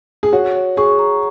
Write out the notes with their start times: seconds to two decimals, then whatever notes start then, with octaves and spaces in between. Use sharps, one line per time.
0.23 G#4
0.33 F#4 C#5
0.55 C#5
0.77 G#4 C#6
0.99 A#5